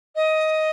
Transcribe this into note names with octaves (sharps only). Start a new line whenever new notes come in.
D#5